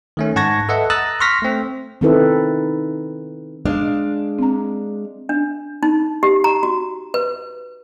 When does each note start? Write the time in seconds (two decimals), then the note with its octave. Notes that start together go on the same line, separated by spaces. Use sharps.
0.17 D#3 A3 C#4
0.36 G#2 F#5 A5 C#6 G#6 A#6
0.69 A4 B4 D#5 E5 F#5
0.90 A#5 D#6 E6 F#6 A6 A#6
1.20 C6 C#6 F6 A#6 B6
1.42 A3 C4
2.01 D#3 C4 D#4 E4 A4 B4
3.65 G#3 D4 F5
4.39 C4 A#5
5.29 D4
5.83 D#4
6.23 G4
6.44 A#5
6.63 F#4
7.14 B4